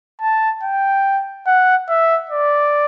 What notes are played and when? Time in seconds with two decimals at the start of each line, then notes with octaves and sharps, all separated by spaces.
0.21 A5
0.63 G5
1.46 F#5
1.89 E5
2.30 D5